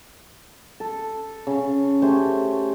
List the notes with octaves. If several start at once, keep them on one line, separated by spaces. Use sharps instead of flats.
A4
C#3
A3 C#4 G4 C5